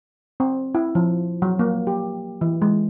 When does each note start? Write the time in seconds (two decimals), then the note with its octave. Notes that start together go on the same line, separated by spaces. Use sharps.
0.40 C4
0.75 E4
0.95 F3
1.42 F#3
1.59 A#3
1.87 G4
2.41 E3
2.62 G#3